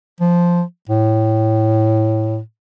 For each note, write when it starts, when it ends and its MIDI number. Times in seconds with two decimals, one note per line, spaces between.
0.20 0.62 53
0.89 2.39 45